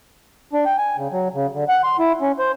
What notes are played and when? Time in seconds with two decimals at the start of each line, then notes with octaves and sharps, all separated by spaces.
0.53 D4
0.65 G5
0.78 G#5
0.97 C#3
1.12 F#3
1.34 C#3
1.54 D3
1.69 F#5
1.84 C6
1.99 E4
2.21 C#4
2.39 C5